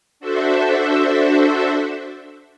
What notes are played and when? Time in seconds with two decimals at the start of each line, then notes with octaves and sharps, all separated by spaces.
0.20 D4 F#4 A4 C5 E5